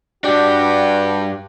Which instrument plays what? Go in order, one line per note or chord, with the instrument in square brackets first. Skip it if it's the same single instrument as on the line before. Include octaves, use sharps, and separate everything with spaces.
[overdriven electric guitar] G2 D4 [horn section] F#4 G4